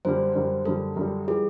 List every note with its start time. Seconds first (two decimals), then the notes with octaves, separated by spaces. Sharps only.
0.05 F#2 D3 G3 C5
0.35 F#2 D3 G3
0.66 F#2 D3 G3 A4
0.96 F#2 D3 G3
1.28 E3 G3 G#4